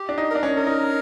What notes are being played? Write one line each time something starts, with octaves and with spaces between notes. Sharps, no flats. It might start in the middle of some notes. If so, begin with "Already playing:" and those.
Already playing: G4
D4
D#4
A#4
D4
C#4
A#4
D#4